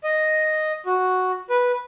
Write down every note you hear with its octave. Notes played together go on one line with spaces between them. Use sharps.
D#5
F#4
B4